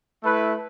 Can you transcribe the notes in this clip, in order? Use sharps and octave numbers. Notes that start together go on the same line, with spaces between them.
A3 E4 B4